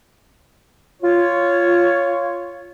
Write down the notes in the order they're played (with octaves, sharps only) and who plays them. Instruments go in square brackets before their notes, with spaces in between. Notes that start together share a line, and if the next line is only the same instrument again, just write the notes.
[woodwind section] F4 C#5